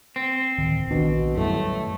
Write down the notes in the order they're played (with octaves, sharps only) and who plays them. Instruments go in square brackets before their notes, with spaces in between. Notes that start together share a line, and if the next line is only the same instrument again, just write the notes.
[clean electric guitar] C4
[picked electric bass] D1 D#3
[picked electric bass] A#1 D#3 D4 [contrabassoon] B2
[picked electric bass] F#2 G3 [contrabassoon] A2 [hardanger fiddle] A3